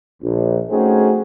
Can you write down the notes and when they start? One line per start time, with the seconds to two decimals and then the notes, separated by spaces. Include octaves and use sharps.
0.22 A#1
0.70 A3 C4 C#4 D#4 F#4 G#4